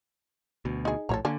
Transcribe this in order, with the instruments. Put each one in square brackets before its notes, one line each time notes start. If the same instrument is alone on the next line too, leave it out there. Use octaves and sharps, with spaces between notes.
[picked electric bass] D2 B2
[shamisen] D#4 G#4
[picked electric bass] A#1 A2 [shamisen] A4 C#5 A#5
[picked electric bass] D3 [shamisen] A#3 C#4 D4